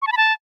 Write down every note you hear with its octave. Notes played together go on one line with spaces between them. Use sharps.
C#6
A5
B5
A5